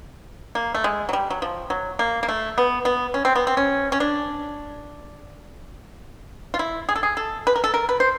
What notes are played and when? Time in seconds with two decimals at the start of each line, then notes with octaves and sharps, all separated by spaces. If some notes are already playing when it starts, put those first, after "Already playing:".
0.55 A#3
0.75 A3
0.84 G#3
1.09 F#3
1.13 G3
1.30 F#3
1.42 F3
1.70 F#3
1.99 A#3
2.23 A#3
2.28 A3
2.58 B3
2.85 B3
3.14 C#4
3.25 C4
3.35 B3
3.47 C4
3.57 C#4
3.92 C#4
4.00 D4
6.54 F4
6.59 E4
6.89 G#4
6.96 A4
7.03 G#4
7.17 A4
7.47 B4
7.56 A#4
7.64 A4
7.74 A#4
7.89 B4
8.00 C5